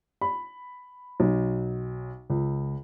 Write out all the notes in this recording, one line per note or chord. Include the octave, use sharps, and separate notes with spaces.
B5
B1
C#2